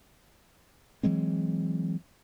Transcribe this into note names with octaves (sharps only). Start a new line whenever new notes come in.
E3 F#3 G#3 C4